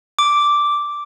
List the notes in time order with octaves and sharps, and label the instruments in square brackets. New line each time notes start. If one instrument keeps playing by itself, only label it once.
[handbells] D6